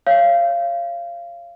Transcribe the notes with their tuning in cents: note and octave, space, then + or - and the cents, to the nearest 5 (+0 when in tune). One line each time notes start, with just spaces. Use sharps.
C#5 +0 F5 -25